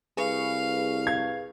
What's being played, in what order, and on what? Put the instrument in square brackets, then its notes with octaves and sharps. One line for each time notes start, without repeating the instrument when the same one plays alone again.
[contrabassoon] C2 [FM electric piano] G#4 B4 C#6 [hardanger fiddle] F5
[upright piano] F5 G#6